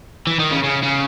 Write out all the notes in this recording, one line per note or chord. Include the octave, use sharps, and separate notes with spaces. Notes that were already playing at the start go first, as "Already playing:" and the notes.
E3
D#3
C#3
C#3
C#3